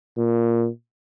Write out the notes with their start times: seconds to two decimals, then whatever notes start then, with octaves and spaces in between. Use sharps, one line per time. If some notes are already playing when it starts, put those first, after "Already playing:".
0.18 A#2